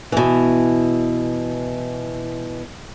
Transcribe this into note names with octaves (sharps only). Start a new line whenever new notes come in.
B2 E3